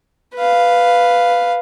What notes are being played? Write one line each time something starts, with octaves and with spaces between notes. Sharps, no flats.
B4 F5